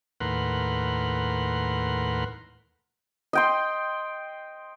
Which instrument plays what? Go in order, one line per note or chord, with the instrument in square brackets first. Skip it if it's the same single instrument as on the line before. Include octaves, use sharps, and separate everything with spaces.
[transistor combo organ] D#2 A2 A#4 B4 F#5 C6
[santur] D#5 G5 C6